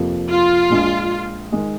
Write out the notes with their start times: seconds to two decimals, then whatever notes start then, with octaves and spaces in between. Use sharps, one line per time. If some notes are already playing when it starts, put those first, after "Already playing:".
Already playing: F2 C3 F3 A#3
0.29 F4
0.69 A#1 A#2 G#3 D4
1.52 D#3 G#3